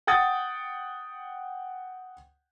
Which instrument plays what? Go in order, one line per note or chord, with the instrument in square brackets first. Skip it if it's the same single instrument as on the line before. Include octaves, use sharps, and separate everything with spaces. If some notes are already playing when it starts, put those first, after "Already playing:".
[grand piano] F#5 G5 D#6 A6